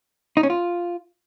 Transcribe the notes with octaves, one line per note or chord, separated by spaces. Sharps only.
D#4
C#4
F4